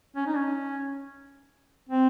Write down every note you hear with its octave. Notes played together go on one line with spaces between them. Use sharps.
C#4
D#4
C#4
C4